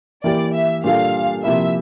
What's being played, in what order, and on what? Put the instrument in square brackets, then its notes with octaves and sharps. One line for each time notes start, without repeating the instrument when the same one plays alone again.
[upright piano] E3 A#3 E4 G4 [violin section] D5
[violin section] E5
[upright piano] A#2 G3 D4 F4 A4 [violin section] F5
[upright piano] C3 F3 A#3 E4 [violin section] E5